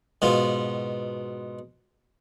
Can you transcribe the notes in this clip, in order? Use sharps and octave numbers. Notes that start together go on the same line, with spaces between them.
G#2 B2 F4